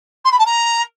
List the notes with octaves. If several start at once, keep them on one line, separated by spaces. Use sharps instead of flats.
C6
B5
A5
A#5